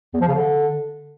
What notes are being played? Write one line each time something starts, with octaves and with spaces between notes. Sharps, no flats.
E2
F3
C#3
D3